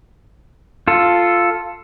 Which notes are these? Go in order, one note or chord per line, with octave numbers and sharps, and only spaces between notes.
F4 A4